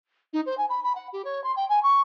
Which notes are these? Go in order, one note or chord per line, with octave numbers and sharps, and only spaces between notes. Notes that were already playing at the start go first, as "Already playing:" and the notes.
D#4
C5
G#5
B5
B5
F#5
G4
C#5
C6
G5
G#5
C#6